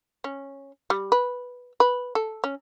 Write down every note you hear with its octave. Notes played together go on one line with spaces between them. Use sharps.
C#4
G3
B4
B4
A4
C#4